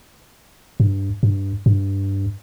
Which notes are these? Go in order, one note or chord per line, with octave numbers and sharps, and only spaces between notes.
G2
G2
G2